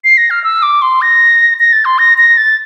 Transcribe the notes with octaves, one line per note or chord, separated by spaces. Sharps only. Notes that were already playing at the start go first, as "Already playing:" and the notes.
C7
A#6
F6
E6
D6
C6
A#6
A#6
A6
C6
A#6
A#6
A6